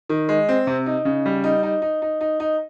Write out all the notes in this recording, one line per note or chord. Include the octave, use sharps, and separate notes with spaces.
D#3
G#3
C4
C3
D#4
C#3
G3
D#4
D#4
D#4
D#4
D#4
D#4